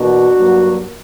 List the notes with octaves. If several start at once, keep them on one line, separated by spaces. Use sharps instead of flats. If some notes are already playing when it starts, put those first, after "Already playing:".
Already playing: E2 B2 A#3 D4 F#4
G2 F#3 A#3